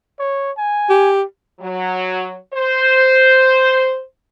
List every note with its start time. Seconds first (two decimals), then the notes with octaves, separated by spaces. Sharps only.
0.19 C#5
0.58 G#5
0.90 G4
1.59 F#3
2.54 C5